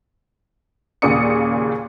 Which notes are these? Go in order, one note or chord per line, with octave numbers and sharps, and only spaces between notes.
D#2 A#2 C#3 D5 D#6 C#7